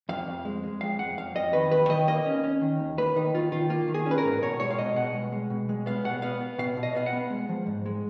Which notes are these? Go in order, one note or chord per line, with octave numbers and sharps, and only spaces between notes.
F2 F5
F2
G#3
G#3
F2 F5
F2 F#5
F2 F5
F2 D#5
D#3 B4
D#2 B4
D#3 D#5
A#3 D#5
C#4
C#4
D#3
D#2
A#3 B4
D#3 D#4
D#3 F4
D#3 F4
A#3 F4
D#3
G#4
C#4
B4
A#4
G#2
B2 C#5
G#3 C#5
F5
B2 D#5
B2 F#5
G#3
G#3
B2
G#3
B3 F5
B2 F#5
B3 F5
B3
B2 F5
B2
D#5
B3 F5
F#5
B3
G#3
F3
G#2
G#3